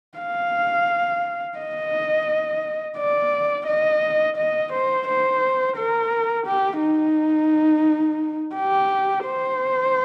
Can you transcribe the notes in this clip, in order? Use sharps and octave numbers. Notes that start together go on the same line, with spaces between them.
F5
D#5
D5
D#5
D#5
C5
C5
A#4
G4
D#4
G4
C5